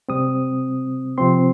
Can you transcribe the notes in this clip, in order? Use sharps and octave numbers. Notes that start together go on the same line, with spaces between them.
C3 G3 C4 D#6
C3 F3 C4 C6